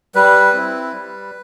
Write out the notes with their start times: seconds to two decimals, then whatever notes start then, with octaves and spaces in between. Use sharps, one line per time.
0.15 G3 B4
0.53 C4 E4
0.92 G3